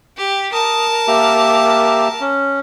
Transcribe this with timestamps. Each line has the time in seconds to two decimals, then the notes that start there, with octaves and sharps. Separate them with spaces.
0.17 G4
0.53 A#4 A5 D#6
1.08 A#3 G4 E5
2.21 C#4